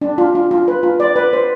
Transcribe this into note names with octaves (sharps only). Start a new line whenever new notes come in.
D4
F4
F4
F4
B4
F4
D5
B4
C5